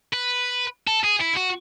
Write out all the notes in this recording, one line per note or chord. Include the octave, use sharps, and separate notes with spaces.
B4
A4
G#4
E4
F#4